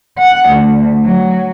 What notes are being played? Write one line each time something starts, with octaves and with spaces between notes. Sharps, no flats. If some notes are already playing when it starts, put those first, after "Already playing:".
F#5
D2
F#3